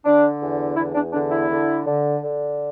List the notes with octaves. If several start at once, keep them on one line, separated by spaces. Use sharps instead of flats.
D3 D4
E2
E2 E4
D4
D3 D4
E4
D3
D3
D3